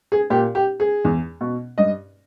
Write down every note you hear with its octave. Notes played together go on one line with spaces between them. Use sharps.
G#4
A#2 G4
G4
G#4
E2
B2
G2 D#5